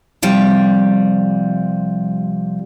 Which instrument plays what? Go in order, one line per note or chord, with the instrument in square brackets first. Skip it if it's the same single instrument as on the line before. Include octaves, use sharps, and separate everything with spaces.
[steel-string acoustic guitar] C3 F3 G3 G5